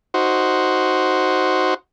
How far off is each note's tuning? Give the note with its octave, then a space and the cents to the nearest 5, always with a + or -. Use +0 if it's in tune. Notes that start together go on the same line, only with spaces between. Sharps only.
D#4 +0 F#4 +0 C5 +0